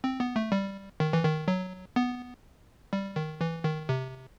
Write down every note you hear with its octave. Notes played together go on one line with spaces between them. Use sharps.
C4
B3
A3
G3
D#3
E3
D#3
F#3
B3
G3
D#3
E3
D#3
C3